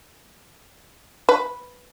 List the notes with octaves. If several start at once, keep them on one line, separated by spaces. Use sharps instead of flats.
B4